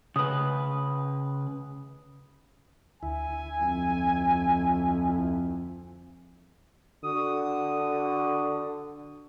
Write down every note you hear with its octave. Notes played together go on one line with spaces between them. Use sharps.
C#3 B4 D#6
D2 E4 G#5
F2
D3 F#4 D#6